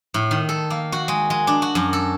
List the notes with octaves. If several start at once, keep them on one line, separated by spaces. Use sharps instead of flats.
A2
D#3
A4
A#3
F#4
G#3
G#3
D4
F#4
F#2
A4